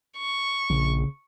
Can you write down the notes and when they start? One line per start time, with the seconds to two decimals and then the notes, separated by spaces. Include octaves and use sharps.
0.17 C#6
0.70 A#1 C#3